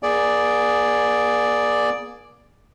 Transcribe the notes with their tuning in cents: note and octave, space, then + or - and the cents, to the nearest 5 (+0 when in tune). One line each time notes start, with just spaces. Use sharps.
A#3 +35 G#4 +0 D5 +0